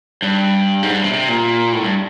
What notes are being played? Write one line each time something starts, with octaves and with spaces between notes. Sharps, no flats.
G2
G#2
G2
C3
C3
A#2
A2
G2